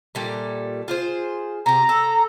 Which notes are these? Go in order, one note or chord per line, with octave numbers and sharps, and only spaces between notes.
A#2 G3 A3
F4 G#4 C5
C3 G4 A#5
A4